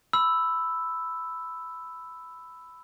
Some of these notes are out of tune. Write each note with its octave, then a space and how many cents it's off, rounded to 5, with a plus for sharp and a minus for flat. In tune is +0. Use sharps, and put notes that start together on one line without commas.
B5 +10 E6 +0